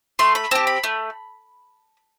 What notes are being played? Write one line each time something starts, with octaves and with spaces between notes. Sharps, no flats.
A3 C6
B5
C4 G4 A5
B5
A3